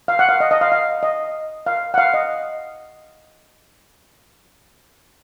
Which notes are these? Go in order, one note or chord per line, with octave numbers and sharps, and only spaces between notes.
F5
F#5
F5
D#5
D#5
F5
F5
D#5
F5
F#5
F5
D#5